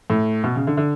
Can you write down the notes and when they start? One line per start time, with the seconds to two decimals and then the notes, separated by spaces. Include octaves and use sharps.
0.10 A2
0.44 B2
0.56 C#3
0.67 D3
0.77 D3